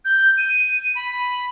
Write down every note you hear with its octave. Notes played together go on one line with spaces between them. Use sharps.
G6
D#7
B5